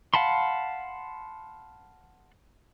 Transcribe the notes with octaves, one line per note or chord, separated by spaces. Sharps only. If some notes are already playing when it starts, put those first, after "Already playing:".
F5 F#5 A5 B5 C6